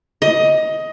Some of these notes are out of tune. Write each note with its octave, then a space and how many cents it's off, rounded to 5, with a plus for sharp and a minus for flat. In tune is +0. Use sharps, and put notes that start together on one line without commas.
D#5 +15